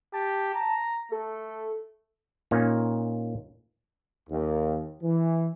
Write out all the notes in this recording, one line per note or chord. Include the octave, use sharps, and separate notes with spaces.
G4 A5
A#5
A3 A4
A#2 A#3 C#4 D#4
D#2
E3